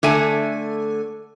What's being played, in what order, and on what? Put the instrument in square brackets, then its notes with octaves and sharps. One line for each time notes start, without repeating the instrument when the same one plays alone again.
[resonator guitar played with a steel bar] D3 A3 G#5